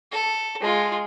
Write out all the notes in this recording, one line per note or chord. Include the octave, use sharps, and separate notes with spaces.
A4
G#3 F4